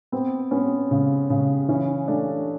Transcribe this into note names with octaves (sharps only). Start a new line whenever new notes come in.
B3 C4
B3 C#4
C#3
C#3
E3 C#4
A3 D4